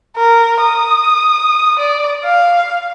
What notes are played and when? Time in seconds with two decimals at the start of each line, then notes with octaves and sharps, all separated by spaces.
0.16 A#4
0.61 D#6
1.79 D5
2.24 F5